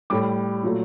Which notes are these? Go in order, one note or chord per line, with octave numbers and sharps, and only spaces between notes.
A2 G3 D6
A#2 F#3 A3